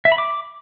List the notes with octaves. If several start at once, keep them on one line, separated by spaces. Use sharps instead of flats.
E5
B5
D6